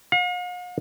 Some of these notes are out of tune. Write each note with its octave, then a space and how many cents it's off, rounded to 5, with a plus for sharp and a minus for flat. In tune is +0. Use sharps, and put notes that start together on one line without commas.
F5 +45